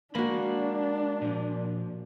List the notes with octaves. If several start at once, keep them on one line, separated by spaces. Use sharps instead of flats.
G#3 A#3 D4 F#4 B5
A#2 F3